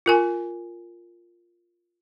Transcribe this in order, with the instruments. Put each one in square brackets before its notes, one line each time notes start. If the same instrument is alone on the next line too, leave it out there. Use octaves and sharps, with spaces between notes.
[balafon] F4 A#4 G#5